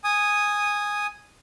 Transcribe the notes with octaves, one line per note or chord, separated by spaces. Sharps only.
G#5 D#6